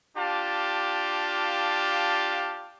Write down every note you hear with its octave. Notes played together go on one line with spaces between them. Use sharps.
D4 F4 G4 F5 A5